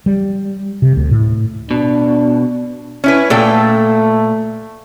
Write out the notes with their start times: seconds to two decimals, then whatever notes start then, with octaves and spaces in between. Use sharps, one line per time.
0.06 G3
0.82 C3
0.96 D2
1.11 A2
1.71 B2 D4
3.04 C#4 E4 B4
3.30 A#2 A3 A4 G5